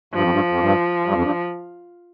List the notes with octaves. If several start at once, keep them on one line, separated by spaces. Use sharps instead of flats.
G2 F3
F2
G2
F2
G2
G2
F2
G2